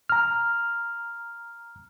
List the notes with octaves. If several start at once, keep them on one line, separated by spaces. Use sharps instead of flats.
A#5 F6